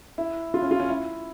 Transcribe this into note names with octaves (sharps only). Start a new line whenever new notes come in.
E4
F4
C#4
F4
C#4
E4